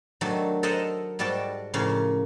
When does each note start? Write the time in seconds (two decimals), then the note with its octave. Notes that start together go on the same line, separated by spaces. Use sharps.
0.21 D#3 F#3 A3 D4
0.63 A4 A#4 C5 D#5 E5 F#5
1.19 G#2 G3 F#4 D5 G5 A5
1.74 A2 C#3 F3 A#3 C#4